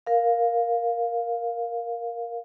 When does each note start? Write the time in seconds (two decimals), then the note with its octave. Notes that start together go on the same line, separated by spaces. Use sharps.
0.06 A#4 F5